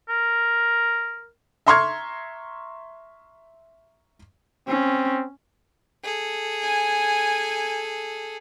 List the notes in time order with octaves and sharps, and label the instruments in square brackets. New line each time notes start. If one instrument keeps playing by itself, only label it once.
[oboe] A#4
[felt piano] E5 A#5 C6 C#6 F6 G#6
[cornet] C4 [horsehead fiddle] C#4
[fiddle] G#4 A4
[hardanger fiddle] G#5